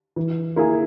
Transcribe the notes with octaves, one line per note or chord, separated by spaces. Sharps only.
E3
A#3 E4 G#4